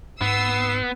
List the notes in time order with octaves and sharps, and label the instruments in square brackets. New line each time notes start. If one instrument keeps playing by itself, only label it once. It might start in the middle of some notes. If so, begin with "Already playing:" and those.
[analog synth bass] G#2 [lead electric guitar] B3 [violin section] E6 C7